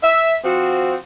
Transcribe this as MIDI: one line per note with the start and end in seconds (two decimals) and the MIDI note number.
0.03 0.35 76
0.44 0.95 53
0.44 0.95 60
0.44 0.95 66